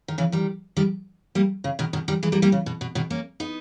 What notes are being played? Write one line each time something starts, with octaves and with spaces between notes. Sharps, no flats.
D#3
C#3 E3
D#3 G3
D#3 G3
G3 A#3
C#3
B2 D#3
B2 D#3
D#3 G3
E3 G#3
G3 A#3
G3 A#3
C#3
B2
B2
B2 D#3
A#3 C#4
B3 D#4